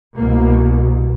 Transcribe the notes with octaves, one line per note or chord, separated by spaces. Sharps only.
C2 B2 A#3